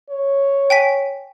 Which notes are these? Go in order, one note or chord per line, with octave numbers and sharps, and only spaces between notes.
C#5
G5 G#5 B6